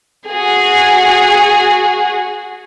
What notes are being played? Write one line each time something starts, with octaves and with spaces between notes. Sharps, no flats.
F#4 G#4